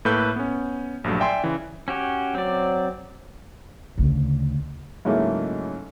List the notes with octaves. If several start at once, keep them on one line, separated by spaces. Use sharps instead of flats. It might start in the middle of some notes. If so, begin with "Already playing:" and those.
A2 A#3 A4 B4 G6
B3 C#4
A#1 G2 F#3 A3
D5 E5 G5 G#5 C6
C#3 E3
C#4 F#4 G4
F#3 C4 D5
D2 C#3
G#2 C#3 F#3 A3 A#3 E4